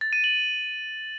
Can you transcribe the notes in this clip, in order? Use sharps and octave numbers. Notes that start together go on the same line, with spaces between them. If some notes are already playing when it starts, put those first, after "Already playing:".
A6
D#7
F#7